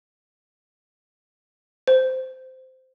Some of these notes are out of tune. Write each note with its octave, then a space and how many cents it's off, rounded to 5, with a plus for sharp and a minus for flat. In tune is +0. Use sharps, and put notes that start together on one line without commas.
C5 -10